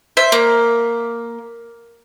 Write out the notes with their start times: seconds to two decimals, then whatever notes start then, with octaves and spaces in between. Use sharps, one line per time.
0.17 C5 E5
0.32 A#3